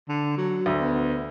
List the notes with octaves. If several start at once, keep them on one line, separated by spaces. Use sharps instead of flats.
D3
F#3
D2
B3